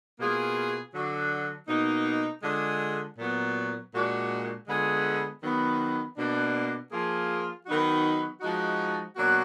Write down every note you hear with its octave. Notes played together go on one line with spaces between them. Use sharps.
B2 A#3 F4 G#4
D3 F#3 D4 F#4
B2 A#3 D#4
D3 G#3 D4 F4 G#4
A#2 F#3 B3
A#2 G#3 D4 F#4
D3 G#3 B3 F4 G#4
D#3 F#3 B3
B2 A#3 D4
F3 A#3 F4 G#4
D#3 F#3 B3 D#4 F#4
F3 G#3 D#4 F#4
B2 F#3 A#3 D4 F#4